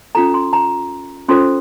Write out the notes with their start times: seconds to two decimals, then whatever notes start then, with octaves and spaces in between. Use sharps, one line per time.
0.15 C#4 F4 A4 A#5
0.34 C6
0.53 A#5
1.28 C#4 F4 A4 C5 C6